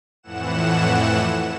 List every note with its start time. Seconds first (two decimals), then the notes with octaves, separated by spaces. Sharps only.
0.23 F2 A2 E3 F#5 E7